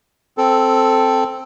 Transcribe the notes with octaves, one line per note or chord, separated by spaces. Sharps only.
C4 A4